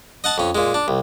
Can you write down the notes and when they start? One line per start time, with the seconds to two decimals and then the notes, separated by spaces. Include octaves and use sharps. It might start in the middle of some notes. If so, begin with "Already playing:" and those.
0.24 D#5 F#5 A5
0.38 F2 C#4
0.55 A#2 G#3
0.74 D4
0.88 C2